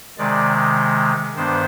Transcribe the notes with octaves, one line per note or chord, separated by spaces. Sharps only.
C3 D#3 G#3 D5
G2 D#3 B3 D4 C5